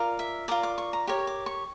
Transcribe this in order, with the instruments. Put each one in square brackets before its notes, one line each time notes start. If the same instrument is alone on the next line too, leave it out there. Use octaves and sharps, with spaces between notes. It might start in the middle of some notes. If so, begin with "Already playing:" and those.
Already playing: [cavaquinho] F4 A#4 D5
E5
F4 A#4 D5 A#5
D6
C#6
A#5
G4 A#4 C#5 C#6
D6
C#6